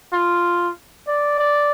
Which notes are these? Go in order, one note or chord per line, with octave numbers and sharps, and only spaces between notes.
F4
D5
D5